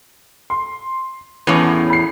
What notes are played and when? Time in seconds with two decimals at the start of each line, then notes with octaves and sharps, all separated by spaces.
0.50 C6
1.47 E2 A2 B3 C#4
1.90 B5 C7